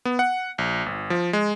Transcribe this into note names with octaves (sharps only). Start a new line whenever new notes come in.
B3
F#5
A#1
G1
F3
G#3